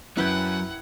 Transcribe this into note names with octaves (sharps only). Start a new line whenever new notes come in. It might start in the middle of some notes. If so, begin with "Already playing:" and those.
F#2 F#3 C#4 E4 B4 F#5 G5 G#6